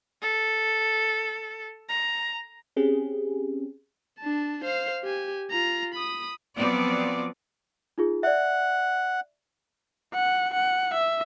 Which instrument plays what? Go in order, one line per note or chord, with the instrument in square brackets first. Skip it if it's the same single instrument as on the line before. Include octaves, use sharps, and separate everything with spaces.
[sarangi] A4
A#5
[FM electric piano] C4 C#4 G4 G#4
[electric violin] D4 A5
C5 F5
G4 G#5
F4 A#5
B5 D#6
[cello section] F3 F#3 B3 C4 D5
[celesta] D#4 F4 G#4
[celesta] D5 E5 [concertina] F#5
[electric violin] F#5
F#5
E5